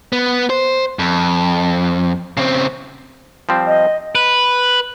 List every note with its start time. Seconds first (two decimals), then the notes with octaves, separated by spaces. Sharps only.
0.13 B3
0.50 C5
0.99 F2
2.37 C#3 C4
3.49 F3 G3 C4
3.66 D#5
4.15 B4